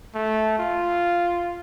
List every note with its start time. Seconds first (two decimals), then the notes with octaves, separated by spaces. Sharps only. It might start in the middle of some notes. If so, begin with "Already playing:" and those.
0.14 A3
0.59 F4